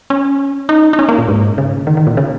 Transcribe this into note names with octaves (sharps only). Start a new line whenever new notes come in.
C#4
D#4
D#4
C#4
A#3
A#2
G#2
C#3
D#3
D#3
A#2
C#3